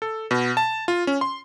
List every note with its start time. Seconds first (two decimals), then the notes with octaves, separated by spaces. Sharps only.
0.02 A4
0.31 B2
0.57 A5
0.88 F4
1.07 C#4
1.21 C6